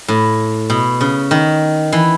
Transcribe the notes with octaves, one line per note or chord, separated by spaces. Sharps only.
A2
B2
C#3
D#3
E3